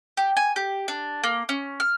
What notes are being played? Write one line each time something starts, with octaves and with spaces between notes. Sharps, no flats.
G4
G#5
G4
D4
A#3
C#4
F6